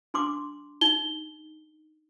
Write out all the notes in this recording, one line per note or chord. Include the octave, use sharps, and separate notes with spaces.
D4 C6 D6
D#4 G7